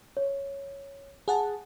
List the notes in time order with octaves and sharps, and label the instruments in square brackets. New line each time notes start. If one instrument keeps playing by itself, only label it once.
[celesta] C#5
[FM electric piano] G#4 F#5 A5